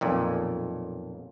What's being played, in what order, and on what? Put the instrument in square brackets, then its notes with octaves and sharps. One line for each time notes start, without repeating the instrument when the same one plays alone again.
[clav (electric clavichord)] B1 F2 A#2